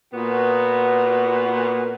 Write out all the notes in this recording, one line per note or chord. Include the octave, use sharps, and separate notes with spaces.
A#2 B3 F#4